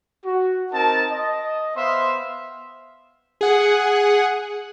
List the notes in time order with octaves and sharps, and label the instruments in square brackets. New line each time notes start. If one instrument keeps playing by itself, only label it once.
[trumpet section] F#4
C4 D#4 A#4 A5
D#5
B3 C5 E5 F5 C6
[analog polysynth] G#4 F#5